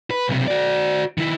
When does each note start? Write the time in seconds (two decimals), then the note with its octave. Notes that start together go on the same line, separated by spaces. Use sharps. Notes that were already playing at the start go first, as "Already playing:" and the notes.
0.11 B4
0.28 B1 C3
0.48 F#4 D5
1.18 D#3 E4